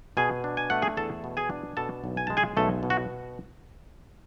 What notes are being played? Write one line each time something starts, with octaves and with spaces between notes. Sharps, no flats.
B2 G#4 G#5
D4
G#5
A3 F#5
G#4 G#5
E2 A4 A5
B2
G#4 G#5
D4
B2 A4 A5
B1
G#5
G#3 A5
G#4 G#5
B1 A3 A4
B2
F#4